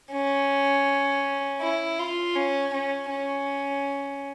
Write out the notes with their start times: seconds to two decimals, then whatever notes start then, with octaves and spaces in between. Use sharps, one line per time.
0.12 C#4
1.61 E4
1.99 F4
2.35 C#4
2.73 C#4
3.10 C#4